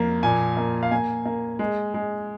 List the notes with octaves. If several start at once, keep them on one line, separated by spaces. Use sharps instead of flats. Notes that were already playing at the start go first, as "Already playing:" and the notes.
Already playing: F2 A#3
A#2 G#5
A#3
F5
A#3 G#5
A#3
G#3
G#3